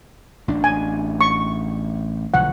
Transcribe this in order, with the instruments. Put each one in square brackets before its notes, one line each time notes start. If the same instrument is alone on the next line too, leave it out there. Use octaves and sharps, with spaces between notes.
[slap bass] A1 D4
[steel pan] G#5
C#6
[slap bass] B1 D3 F3 [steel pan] F#5